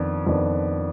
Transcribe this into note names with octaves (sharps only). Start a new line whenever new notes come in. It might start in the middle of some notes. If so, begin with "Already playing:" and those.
Already playing: F2 D#3 B3 D4
F2 D#3 B3 D4